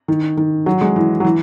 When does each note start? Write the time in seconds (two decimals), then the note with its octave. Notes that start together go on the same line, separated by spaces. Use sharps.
0.08 D#3
0.37 D#3
0.66 F#3
0.81 G#3
0.96 E3
1.20 F#3
1.24 E3